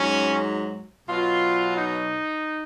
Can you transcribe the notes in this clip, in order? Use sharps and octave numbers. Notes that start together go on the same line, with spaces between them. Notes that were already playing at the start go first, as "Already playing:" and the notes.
Already playing: G#2 F#3 C#4
B2 F#3 F4
D#4